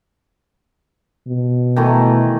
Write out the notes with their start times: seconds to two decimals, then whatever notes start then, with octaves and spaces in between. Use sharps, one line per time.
1.28 B2
1.76 D#3 E3 A3